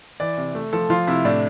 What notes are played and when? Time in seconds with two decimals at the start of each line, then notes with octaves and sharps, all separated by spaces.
0.20 E3 D5
0.37 C3
0.55 A3
0.73 F3 A4
0.90 F3 F4
1.07 C3 E4
1.25 A2 D4